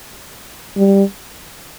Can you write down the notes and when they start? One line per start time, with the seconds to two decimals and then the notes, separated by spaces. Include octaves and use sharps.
0.77 G3